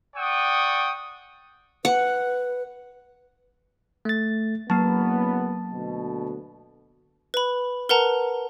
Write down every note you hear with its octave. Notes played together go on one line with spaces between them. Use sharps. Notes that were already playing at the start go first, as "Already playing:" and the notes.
D5 F#5 G5 C#6 D#6
B4 F#5
A3 A6
F#1 F#3 A#3 B3 A5
D2 B2
B4 B5
A#4 B4 F#5 A5 A#5